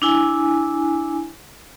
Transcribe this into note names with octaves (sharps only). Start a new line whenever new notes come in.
D4 E4 G#5